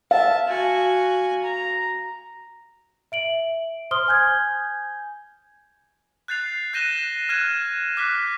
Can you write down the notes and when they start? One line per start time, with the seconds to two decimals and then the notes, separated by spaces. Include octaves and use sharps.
0.11 E5 F5 A5
0.48 F#4 G#5
1.43 A#5
3.12 E5 D7 F#7
3.91 C5 C6 D#6 F6 G7
4.08 G#5 G6 G#6
6.28 F#6 G6 A6 C7 F7
6.73 F#6 G6 A#6 D#7 E7 G7
7.29 F6 F#6 G#6 D#7 E7
7.97 D6 F6 F#6 B6